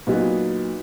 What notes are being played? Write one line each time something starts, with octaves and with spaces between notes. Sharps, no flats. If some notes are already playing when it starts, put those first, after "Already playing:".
A#2 F#3 B3 D#4